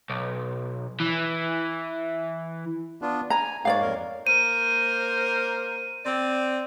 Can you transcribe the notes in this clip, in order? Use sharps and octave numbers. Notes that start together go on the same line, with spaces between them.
B1
E3
B3 D4 F4
G#5 A#5
G#2 G#3 A#3 C#5 D5 F5
F2 A#4
A#3 A#4 C5 D#7
C4 D5